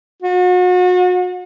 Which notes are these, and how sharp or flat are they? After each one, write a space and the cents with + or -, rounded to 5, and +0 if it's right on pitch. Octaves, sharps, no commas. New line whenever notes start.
F#4 -35